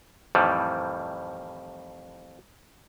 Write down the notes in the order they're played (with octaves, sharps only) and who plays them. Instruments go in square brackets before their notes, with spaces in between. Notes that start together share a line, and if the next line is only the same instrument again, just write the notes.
[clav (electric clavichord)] F2 A2 D#3 E3 G3